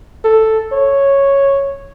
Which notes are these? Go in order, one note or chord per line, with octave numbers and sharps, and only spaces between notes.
A4
C#5